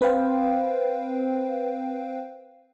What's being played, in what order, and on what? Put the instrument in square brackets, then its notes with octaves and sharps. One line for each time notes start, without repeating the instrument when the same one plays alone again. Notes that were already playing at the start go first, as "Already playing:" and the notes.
[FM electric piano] C4 B4 C5 F5 G5